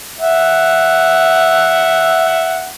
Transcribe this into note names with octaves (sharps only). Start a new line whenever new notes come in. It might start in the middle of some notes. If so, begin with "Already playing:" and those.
E5 F#5